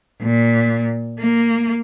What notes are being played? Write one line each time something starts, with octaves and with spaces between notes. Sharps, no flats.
A#2
A#3